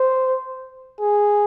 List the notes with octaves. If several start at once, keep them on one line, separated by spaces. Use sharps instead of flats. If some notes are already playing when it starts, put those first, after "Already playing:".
Already playing: C5
G#4